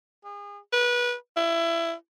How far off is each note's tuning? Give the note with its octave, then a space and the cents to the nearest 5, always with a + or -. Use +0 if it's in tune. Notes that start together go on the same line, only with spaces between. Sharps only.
G#4 -35
B4 -25
E4 +25